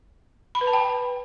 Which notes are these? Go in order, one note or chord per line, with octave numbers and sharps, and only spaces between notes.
B5
B4
A5
G5